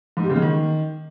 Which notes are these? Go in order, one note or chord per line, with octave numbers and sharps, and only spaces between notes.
G#2
G3
C#3
G#3
D#3